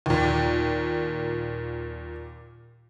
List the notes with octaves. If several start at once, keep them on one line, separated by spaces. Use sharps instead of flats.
D#2 A#2